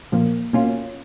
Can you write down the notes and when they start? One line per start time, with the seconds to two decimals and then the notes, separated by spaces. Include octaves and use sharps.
0.12 A#2 F3 A#3
0.53 B2 A#3 C#4 F4